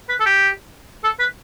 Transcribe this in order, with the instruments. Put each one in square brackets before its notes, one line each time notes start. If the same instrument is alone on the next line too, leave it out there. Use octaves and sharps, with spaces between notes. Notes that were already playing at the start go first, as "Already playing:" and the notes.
[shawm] B4
A4
G4
A4
B4